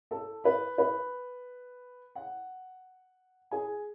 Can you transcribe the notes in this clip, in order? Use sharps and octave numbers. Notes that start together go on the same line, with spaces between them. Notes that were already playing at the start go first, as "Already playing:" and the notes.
A4 A5
B4 B5
B4 B5
F#5
G#4 G#5